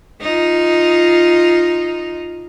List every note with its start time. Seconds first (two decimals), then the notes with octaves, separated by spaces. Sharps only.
0.22 D#4 F4